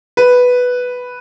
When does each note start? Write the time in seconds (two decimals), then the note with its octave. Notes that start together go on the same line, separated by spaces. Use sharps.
0.17 B4